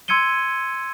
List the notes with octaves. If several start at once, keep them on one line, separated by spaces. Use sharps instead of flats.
C6 E6 G#6 C#7 D#7 G7